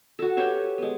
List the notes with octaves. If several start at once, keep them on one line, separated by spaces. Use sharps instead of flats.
F#4 A4
G4 B4 C#5 E5
G#3 B3